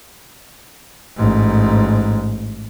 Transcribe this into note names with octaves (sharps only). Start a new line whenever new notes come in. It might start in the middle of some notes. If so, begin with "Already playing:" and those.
A1 G#2